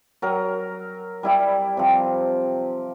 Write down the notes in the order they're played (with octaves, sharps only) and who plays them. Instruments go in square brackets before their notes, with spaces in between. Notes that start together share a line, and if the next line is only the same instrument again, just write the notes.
[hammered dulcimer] F#3 A#4 A#5
G3 E4 D5
C3 F3